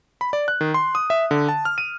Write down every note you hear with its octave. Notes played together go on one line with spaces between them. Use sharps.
B5
D5
F#6
D#3
C6
D#6
E5
D3
A5
F6
D#7